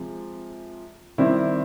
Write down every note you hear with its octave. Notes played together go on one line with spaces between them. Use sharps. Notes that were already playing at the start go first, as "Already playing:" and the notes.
Already playing: C3 F3 G#3
C3 D#3 G3 C4 E4